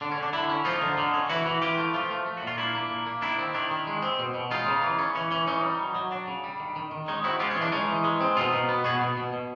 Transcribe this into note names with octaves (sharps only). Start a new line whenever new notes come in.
D3 D4
C#4
D3 D4
D3 D4 E4
C#4
F3 D#4 F4
D3
D3
C#4
E3 E4 F#4
E3
E3 F4 G4
A3
F3 F4 G4
A3
A3
F#4
A#2 F4
A#3 D4 E4
A#3
A#2
A#3
D#3 D4 E4
C4
D#3 D4 E4
D#3
G#3
C4
B2
B2
G#3 D#4 F4
C#3
E3
C#4
E3 C#4
E3 C#4
E3 C#4 D#4
G3
F#3
F#3
F#3 D4
C#3
G3
D#3
D#3
D#3
G#3 C#4 D#4
C4 E4 F#4
G#3 F4 G4
C#4
E3 D4
G#3 C#4 D#4
E3
G#3
C4
B2 D#4 F4
B2
B3
B2 F#4 G#4
B2
B2
B2